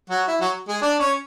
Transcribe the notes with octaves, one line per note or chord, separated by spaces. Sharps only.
F#3 F#4
E4
F#3 F#4
G#3 G#4
D4 D5
C#4 C#5